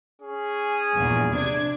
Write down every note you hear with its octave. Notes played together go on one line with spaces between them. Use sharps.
C#4 G#4
A#1 E2 G2
C3 D4 G#6